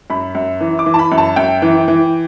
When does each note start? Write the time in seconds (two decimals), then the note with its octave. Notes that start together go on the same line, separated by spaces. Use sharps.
0.10 F#2 B5
0.35 F#2
0.61 E3
0.79 D6
0.86 E3
0.94 A5
0.99 B5
1.12 F#2
1.18 A5
1.36 F#2 G5
1.62 E3
1.88 E3